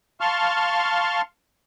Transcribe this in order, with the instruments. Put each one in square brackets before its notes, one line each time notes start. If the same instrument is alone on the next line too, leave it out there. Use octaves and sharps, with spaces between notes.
[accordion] F5 A5 C6 C#6 F6